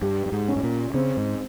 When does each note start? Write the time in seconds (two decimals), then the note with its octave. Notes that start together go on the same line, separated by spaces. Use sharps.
0.02 G2 G4
0.26 G2
0.32 G#2
0.48 C#4
0.56 G#2
0.63 A#2
0.94 C#3 C4
1.17 G#2